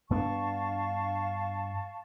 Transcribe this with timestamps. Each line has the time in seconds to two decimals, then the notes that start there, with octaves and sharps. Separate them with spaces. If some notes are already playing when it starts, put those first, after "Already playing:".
0.10 G2 B3 D4 F5 A5 C#6